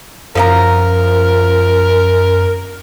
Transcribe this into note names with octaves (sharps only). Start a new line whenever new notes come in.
F#2 F3 A#4 D#5 A#5